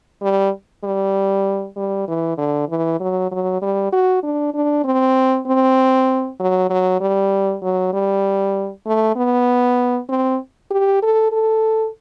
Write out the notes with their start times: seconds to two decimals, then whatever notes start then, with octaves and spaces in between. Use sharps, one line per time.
0.22 G3
0.84 G3
1.77 G3
2.08 E3
2.38 D3
2.69 E3
3.00 F#3
3.31 F#3
3.62 G3
3.92 F#4
4.23 D4
4.54 D4
4.84 C4
5.47 C4
6.40 F#3
6.70 F#3
7.01 G3
7.63 F#3
7.93 G3
8.87 A3
9.16 B3
10.09 C4
10.71 G4
11.02 A4
11.32 A4